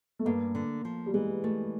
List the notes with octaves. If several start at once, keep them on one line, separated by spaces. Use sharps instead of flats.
A3
G2 A#3
D3
F3
G3
E3 G#3
A3